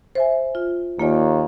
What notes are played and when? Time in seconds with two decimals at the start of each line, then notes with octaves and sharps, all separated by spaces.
0.15 C5 E5 G#5
0.55 F4
0.99 D#2 A#3 F4 D5